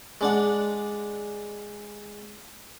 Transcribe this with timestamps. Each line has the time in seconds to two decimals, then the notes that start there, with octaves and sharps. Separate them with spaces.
0.21 G#3 D4 F#5